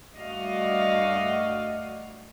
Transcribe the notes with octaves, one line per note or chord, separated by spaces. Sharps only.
G2 A3 F#4 D5 D#5 F5